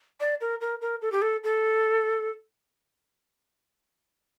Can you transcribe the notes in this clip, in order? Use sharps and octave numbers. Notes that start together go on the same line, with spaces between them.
D5
A#4
A#4
A#4
A4
G4
A4
A4